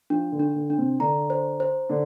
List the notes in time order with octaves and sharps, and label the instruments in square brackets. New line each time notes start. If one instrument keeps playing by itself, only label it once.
[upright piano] F3 [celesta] D4
[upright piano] D3
[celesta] D4
[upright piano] D3
[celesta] D4
[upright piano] C3 C4
[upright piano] D3 D4 [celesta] A#5
[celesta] C5
C5
[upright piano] D3 D4